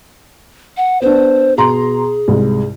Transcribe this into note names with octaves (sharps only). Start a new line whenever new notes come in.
F#5
B3 D4 C5
B2 G#4 A#5 C6
C2 G#2